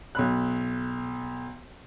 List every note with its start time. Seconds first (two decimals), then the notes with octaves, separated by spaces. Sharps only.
0.15 B1 B5 F#6